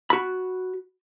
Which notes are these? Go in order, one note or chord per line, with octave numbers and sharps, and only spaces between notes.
F#4 B5